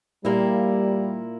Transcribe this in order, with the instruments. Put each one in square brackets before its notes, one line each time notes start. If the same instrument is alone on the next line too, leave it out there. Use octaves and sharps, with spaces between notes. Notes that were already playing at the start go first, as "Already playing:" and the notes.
[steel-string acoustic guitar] A#2 A#3 E4 [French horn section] G3